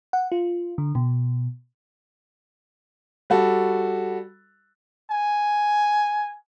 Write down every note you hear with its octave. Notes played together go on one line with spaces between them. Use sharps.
F#5
F4
D3
B2
G3 F#4 A4
G#5